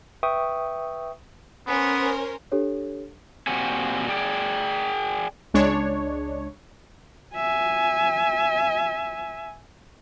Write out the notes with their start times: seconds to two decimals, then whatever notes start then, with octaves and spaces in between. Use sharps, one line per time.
0.23 B4 E5 G5 C#6 D#6
1.67 B3 C#4 A#4 C5
2.52 D4 G4 A4 C#5
3.47 A#2 C4 F#4 G4 G#5
4.09 G#4 D5 G5
5.54 C#2 G#3 D4 C#5
7.34 E5 G#5